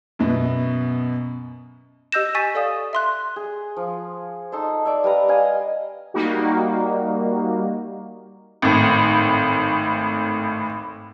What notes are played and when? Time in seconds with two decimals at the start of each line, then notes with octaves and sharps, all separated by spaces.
0.19 F#2 B2 B3
2.12 G4 D#5 E6 G6 A#6 E7
2.35 G#5 C#6 A6 B6 D#7
2.55 A4 D5 F5 D#6
2.93 E5 C6 F#6
3.36 G#4
3.77 F3
4.52 D#4 A4 A5 C6
4.85 D5 E5
5.04 G3 B4 F5 A#5
5.29 D#5 F5 G#5
6.14 G3 A#3 D#4 F#4
8.62 G#1 A2